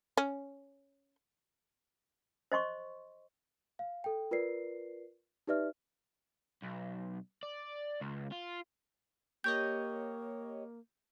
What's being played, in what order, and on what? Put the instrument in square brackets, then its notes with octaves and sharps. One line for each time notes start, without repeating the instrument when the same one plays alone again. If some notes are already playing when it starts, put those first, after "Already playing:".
[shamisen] C#4
[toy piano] C5 D#5 C6 C#6
[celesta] F5
A4 G5
F4 A#4 B4 D5 C7
D#4 G4 B4 D5 E5 F6
[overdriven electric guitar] B1
D5
C#2
F4
[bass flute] A#3 [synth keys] G4 C#5 D#5 [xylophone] G6